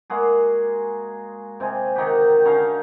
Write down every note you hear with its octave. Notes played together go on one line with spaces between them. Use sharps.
G#3 A#3 F#4 G#4
C3 G#3 G#5
D#3 D#4 F#4 G4
D3 C#4 D#4 F5